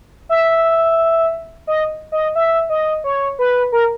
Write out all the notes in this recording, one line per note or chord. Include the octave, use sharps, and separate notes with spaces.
E5
D#5
D#5
E5
D#5
C#5
B4
A#4